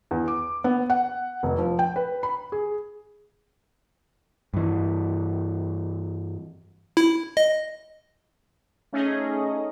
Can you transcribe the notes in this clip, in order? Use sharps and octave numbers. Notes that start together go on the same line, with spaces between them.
E2
D6
B3
F#5
F1
F3
G5
B4
B5
G#4
G2 E3
E4
D#5
A3 C#4 D#4 G#4 D#5